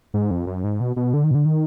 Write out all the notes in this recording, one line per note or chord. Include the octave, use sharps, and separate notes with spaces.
G#2
F2
F#2
G#2
B2
B2
D3
D#3
B2
D3
D#3